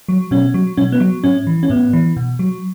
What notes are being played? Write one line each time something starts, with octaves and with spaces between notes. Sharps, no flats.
F#3
B2 C#4
F#3
B2 C#4
B3
F#3
A2 C#4
E3
C#4
A2 B3
E3
B2
F#3